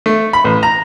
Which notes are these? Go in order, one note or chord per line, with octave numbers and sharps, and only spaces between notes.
A3
B5
A1
A#5